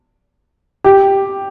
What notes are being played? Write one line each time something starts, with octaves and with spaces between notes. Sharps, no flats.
G4